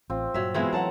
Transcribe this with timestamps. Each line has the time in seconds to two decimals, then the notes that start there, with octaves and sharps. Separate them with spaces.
0.10 A1 C4 F4
0.34 G2 A#2 F#3 E5
0.54 B2 E3 G#3 C4 E4 F4 C#5
0.73 A2 F#3 F#5 A5 A#5